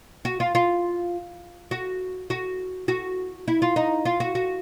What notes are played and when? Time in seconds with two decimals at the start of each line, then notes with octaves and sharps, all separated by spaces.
0.25 F#4
0.40 F4
0.55 F4
1.71 F#4
2.30 F#4
2.88 F#4
3.48 E4
3.62 F4
3.76 D#4
4.05 F4
4.20 F#4
4.35 F#4